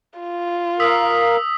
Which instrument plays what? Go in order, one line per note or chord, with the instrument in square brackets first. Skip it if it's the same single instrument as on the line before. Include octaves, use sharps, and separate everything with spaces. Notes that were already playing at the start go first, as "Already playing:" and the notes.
[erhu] F4
[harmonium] A#4 F5 [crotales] D#6 E6 B6